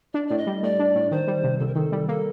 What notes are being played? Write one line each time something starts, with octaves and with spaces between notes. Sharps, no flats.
D4 D5
A2 D5
D#5
G3
A2 D5
D4
A2
D#3 C5
G3
C3
C2 A4
A#4
D#3 A4
G3
A#3 A4